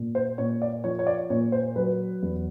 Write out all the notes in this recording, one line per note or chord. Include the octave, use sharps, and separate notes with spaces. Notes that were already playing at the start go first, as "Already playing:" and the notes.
Already playing: A#2
C5
A#2 C#5
D5
F3 C#5
C#5
D5
A#2 C#5
C5
F#3 B4
E2